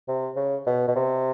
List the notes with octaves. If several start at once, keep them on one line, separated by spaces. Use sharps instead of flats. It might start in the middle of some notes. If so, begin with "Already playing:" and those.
C3
C#3
B2
B2
C3